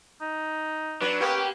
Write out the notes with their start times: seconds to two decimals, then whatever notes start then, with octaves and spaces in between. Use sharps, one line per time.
0.21 D#4
1.01 F#3 D4 B4
1.21 A#3 B3 C#4 G4 G5